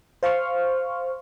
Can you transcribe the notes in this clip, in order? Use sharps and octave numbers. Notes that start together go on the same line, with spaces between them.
C5 F5 C6 C#6 F6